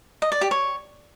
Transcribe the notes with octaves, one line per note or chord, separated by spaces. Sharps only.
D#5
D5
G4
C#5